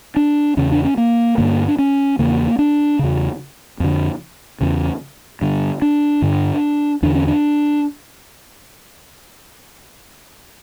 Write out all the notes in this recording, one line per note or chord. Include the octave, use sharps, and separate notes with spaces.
D4
E2 C#3 C#4
D4
C#4
A#3
G2 D3 A#3
D4
C#4
E2 C#3 A#3
D4
E2 C#3
F2 D3
E2 C#3
G2 D3
D4
G2 D3
E2 D3 D4
C#4
D4